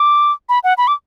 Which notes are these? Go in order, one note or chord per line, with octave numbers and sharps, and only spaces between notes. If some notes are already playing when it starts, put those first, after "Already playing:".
Already playing: D6
B5
F#5
B5
D6